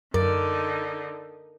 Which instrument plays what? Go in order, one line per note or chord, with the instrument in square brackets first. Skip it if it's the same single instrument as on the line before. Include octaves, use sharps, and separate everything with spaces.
[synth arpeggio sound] F#2 [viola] D3 D#4 [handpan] A#4 [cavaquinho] D5